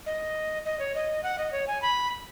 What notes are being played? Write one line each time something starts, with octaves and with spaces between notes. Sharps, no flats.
D#5
D#5
C#5
D#5
F#5
D#5
C#5
G#5
B5